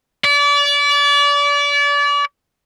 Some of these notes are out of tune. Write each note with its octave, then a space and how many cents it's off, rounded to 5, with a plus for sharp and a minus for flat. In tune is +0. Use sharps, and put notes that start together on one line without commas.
D5 -35